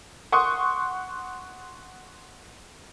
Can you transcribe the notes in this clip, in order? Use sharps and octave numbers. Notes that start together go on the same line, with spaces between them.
F#5 C6 C#6 D#6